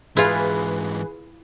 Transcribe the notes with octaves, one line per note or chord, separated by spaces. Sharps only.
G#2 E3 E4 F4 G#4 B4